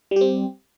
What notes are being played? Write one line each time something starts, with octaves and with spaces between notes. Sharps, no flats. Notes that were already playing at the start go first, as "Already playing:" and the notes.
G3 C4 G4